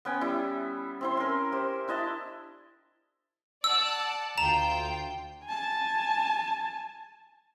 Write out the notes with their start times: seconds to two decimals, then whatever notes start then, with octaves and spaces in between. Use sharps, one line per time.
0.05 B3 C#4 G5 G#5
0.21 G3 E4
1.01 C4 E4 C6
1.17 C#4 A#4
1.52 G4 C5
1.88 D4 E4 D#5 A5
3.64 D5 F#5 A5 E6
4.38 D2 F4 G5 A#5 E7
5.44 G#5 A5